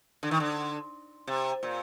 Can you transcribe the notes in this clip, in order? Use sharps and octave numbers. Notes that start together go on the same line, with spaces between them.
D3
D#3
D3
C3
A#2